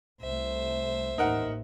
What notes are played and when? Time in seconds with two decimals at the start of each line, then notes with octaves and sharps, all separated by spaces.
0.21 C2 A3 C5 E5
1.18 A1 D#2 D#4 A#4 F#5